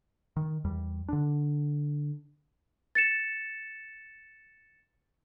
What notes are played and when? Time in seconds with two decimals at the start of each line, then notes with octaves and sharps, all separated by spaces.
0.37 D#3
0.64 E2 G3
1.08 D3 D4
2.95 A6 C#7 E7